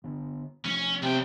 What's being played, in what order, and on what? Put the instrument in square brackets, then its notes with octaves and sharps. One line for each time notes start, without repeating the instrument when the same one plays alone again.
[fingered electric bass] D3 B3
[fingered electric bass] F3 A3 [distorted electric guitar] C#4
[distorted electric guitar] B1 G5 [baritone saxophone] C3